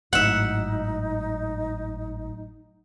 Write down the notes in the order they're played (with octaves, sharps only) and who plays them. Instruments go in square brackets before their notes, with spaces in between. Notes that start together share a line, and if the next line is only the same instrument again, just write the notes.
[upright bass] G#1 [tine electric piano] A2 F#3 [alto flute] D#4 [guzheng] E5 F#5